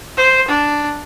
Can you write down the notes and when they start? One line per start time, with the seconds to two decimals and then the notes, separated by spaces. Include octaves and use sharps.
0.17 C5
0.48 D4